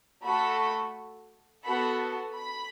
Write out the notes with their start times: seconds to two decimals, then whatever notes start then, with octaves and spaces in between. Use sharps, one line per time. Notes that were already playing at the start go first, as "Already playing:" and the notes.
0.24 A3 F#4 A4 B5
1.64 B3 F#4 A4 B5
2.34 B5